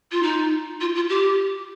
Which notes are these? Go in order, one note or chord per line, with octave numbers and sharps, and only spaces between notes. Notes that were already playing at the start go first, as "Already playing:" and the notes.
F4
D#4
F4
F4
G4